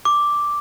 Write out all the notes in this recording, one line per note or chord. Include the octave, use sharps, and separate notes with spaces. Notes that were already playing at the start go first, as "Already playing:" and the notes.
D6